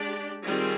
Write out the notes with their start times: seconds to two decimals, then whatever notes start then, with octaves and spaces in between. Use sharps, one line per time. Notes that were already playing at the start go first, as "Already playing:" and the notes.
Already playing: G#3 D4 G4 D5
0.45 D#3 G3 C4 F4 G#4